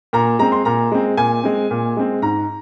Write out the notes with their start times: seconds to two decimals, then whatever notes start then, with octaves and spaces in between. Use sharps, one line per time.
0.13 A#2 A#5
0.39 G#3 C4 A#5
0.52 C6
0.65 A#2 A#5
0.92 G#3 C4
1.17 A#2 G#5
1.44 G#3 C4
1.71 A#2
1.97 G#3 C4
2.22 G#2 A#5